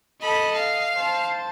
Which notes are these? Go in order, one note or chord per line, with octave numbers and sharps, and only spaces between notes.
A4 D#5 B5
F5
C5 A5